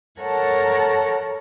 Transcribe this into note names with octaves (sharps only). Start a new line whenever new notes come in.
A4 A#4 C#5 F#5 A5